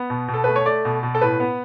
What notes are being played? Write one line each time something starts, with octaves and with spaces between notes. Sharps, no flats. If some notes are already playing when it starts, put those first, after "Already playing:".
Already playing: B3
B2
B2
A4
A3 B4
C#5
A3 D5
B2
B2
A4
A2 B4
B3